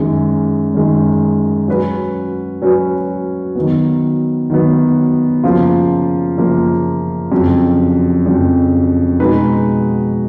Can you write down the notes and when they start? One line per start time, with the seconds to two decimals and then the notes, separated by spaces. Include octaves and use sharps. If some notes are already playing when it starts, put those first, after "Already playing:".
Already playing: F#2 D#3 G#3
0.74 F#2 D#3 G#3
1.68 F#3 C#4 F#4 B4
2.62 F#3 C#4 F#4 B4
3.56 D#3 F#3 B3
4.50 D#3 F#3 B3
5.44 F#2 C#3 F3 A#3 F4
6.38 F#2 C#3 F3 A#3 F4
7.31 F2 C#3 F#3
8.26 F2 C#3 F#3
9.20 B2 G#3 D#4 F#4 B4